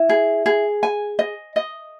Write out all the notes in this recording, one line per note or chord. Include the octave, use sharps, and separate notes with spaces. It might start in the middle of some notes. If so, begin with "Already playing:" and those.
Already playing: E4
G#4
G#4
G#5
D#5
D#5